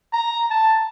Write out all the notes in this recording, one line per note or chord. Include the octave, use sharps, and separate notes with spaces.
A#5
A5